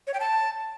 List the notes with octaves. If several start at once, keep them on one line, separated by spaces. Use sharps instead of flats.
C#5
G5
A5